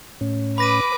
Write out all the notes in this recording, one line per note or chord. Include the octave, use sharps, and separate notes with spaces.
A2 C#4
B4 B5 D6 A#6 D#7